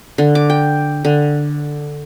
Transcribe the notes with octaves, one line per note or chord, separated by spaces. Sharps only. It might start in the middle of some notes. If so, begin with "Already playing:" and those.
D3
D6
G5
D3